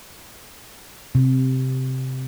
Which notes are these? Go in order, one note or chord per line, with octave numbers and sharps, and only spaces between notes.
C3